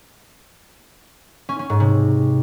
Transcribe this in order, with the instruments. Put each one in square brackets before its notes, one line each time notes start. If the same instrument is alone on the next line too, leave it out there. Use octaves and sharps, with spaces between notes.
[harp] C#4
C#4
G#2
C3